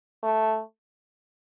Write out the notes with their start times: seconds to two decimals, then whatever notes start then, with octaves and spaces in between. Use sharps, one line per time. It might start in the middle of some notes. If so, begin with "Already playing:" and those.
0.23 A3